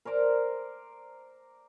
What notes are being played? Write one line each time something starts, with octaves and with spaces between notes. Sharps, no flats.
A#4 C5 D5 A#5